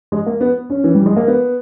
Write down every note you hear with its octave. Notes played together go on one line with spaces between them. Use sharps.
G#3
A#3
B3
C#4
E3
G3
G#3
A#3
B3